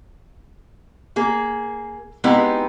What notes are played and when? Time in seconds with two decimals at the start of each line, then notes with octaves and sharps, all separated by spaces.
1.16 A#3 G#4
2.24 G#3 B3 C4 D#4 E4 G4